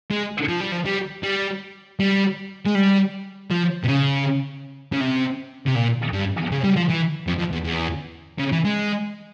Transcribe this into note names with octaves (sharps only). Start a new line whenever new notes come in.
G#3
F3
G3
F3
G3
G3
G3
G#3
G3
F3
C3
C#3
C#3
C3
C3
A#2
G2
C#3
G3
F3
E3
F2
F2
E2
E2
C#3
E3
G#3